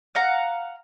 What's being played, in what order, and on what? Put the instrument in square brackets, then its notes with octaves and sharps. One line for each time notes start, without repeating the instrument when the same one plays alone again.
[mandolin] F5 F#5 A#5